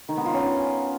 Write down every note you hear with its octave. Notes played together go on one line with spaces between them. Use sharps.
D#3
B3
F4
C#4